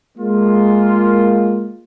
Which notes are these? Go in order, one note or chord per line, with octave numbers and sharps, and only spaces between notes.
G#3 A#3 F4